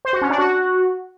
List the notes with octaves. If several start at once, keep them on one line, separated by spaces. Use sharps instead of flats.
C5
F#4
C#4
D4
F#4